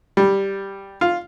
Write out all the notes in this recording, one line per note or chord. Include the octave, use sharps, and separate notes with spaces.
G3
F4